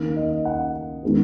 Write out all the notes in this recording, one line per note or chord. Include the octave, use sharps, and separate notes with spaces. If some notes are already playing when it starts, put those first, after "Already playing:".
Already playing: D#3 A#3
D#5
F#5
D#3 G#3 B3